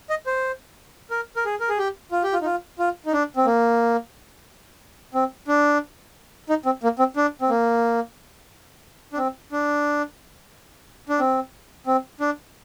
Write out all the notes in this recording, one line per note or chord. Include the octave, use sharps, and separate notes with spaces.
D#5
C5
A#4
A#4
G#4
A#4
G#4
G4
F4
G4
F4
D#4
F4
F4
D#4
D4
C4
A#3
C4
D4
D#4
C4
A#3
C4
D4
C4
A#3
D4
C4
D4
D4
C4
C4
D4